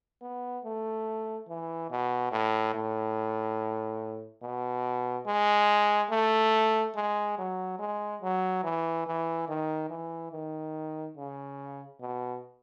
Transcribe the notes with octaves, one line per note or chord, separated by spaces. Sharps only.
B3
A3
E3
B2
A2
A2
B2
G#3
A3
G#3
F#3
G#3
F#3
E3
E3
D#3
E3
D#3
C#3
B2